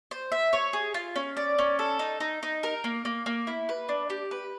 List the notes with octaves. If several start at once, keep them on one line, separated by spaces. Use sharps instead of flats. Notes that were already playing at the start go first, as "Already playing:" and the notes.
C5
E5
C#5
G#4
F4
C#4
D5
C#4
A4
D#4
D#4
D#4
A#4
A#3
A#3
A#3
E4
B4
D4
G4
B4